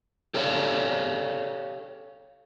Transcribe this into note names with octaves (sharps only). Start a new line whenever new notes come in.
G4 A4 C#5 D5 F5